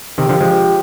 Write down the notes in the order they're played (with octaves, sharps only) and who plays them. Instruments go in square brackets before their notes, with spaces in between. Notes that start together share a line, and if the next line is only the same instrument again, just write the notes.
[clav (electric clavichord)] C3 D#3 [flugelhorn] G4
[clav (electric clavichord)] D3 F3
F3 G#3